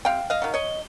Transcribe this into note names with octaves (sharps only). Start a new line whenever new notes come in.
C3 F5 G5
D#5 F5
D#3 F#3
C#5 D#5